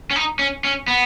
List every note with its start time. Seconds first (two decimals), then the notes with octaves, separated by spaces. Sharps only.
0.11 C#4
0.16 D#4
0.39 C#4
0.64 C#4
0.88 B3